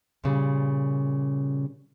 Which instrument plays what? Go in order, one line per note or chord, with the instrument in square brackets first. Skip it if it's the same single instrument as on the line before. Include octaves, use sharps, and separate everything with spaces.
[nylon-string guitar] A#2 C#3 G3